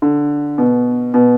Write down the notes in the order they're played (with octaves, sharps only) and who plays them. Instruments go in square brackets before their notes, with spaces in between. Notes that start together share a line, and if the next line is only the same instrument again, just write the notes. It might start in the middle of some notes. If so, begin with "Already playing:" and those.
[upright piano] D3
B2
B2